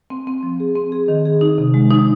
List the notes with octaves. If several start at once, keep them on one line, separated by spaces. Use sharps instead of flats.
C4
C4
F3
G#4
C4
G#4
D#3
G#4
D#4
C3
G#3
D#4